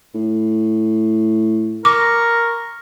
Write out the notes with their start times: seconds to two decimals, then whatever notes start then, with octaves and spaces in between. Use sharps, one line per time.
0.14 A2
1.85 A#4 C#6 D6